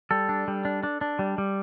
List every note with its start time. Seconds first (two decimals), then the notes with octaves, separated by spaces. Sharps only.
0.11 G3 A4
0.29 D4
0.48 G3
0.65 D4
0.83 D4
1.01 D4
1.19 G3
1.38 G3